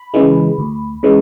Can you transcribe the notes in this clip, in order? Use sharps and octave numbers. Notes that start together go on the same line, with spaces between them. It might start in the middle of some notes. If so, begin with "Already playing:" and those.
Already playing: B5
C#3 E3 G#3
D2
C#3 E3 G#3